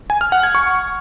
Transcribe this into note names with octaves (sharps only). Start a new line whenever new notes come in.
G#5
F6
F#5
G#6
C#6